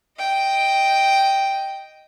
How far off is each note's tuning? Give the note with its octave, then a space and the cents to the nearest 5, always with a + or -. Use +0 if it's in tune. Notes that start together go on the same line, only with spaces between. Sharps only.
D#5 +0 G5 +0